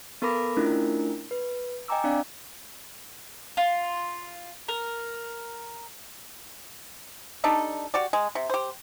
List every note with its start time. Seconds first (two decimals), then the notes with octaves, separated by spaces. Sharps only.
0.22 B3 A4 A#4 B5 D6 A#6
0.57 A3 C#4 D4 E4 F4 A#4
1.31 B4
1.88 D#5 G5 G#5 A#5 D6 E6
2.04 C4 D4 D5 F5
3.57 F4
4.68 A#4
7.44 G3 D4 D#4 A4
7.94 F#4 G4 D5
8.13 G#3
8.35 C3
8.50 G4 C5